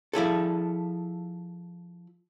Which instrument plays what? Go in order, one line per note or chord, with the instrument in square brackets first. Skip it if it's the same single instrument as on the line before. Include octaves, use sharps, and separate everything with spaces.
[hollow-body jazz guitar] F3 E4 G#4 A4